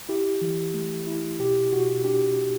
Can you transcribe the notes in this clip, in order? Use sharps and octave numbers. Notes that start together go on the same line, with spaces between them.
E4 G4
E3
A3
E4
B2 G4
B2 F#4
D4 G4